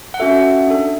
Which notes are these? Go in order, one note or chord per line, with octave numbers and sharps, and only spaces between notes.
F#5
C#4 F#4 A4 E5
D4 A4